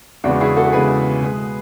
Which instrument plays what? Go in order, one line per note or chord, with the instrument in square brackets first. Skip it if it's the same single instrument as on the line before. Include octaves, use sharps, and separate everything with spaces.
[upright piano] E2 C#3 G#3 B3 D4 F#4
E4 G#4
F#4 A4
E2 C#3 G#3 B3 G#4 B4
B2 G#3 B3